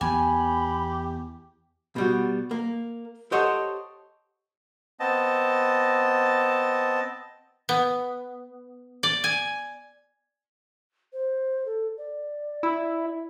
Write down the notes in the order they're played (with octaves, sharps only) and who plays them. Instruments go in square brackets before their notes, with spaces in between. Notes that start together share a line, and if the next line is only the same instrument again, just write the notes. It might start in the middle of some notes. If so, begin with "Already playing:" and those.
[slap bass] E2 B3 [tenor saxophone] G4 [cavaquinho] G#5 [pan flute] B5
[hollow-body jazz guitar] B2 G3 F#4
A#3
G4 A4 C5 C#5 D#5 F#5
[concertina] B3 C4 D#5 A5
[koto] B3
D5
G#5
[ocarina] C5
A4
D5
[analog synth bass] E4